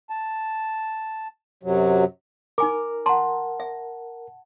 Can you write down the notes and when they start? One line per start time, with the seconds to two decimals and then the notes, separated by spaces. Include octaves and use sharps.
0.10 A5
1.63 F#2 C3 F#3
2.58 D#4 A#4 G#5 D6
3.06 F#5 A5 A#5 C6
3.60 E5